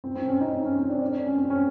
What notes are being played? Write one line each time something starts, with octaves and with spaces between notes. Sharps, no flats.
C4
C4
C#4
D#4
C#4
C4
D4
D4
C#4
C4
C#4